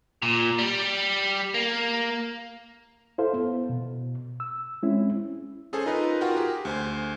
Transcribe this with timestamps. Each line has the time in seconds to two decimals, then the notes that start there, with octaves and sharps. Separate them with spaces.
0.22 A#2
0.59 G3
1.54 A#3
3.18 E4 A4 C5 F5
3.33 B3
3.69 B2
4.40 E6
4.83 G#3 C4 C#4 E4
5.73 C#4 G#4 A4 C5 G#5
5.86 D#4 F4 A#4 B4 D#5
6.21 F4 F#4 A#4 F#5 G5
6.37 G4 G#4
6.65 D2 C5 G#5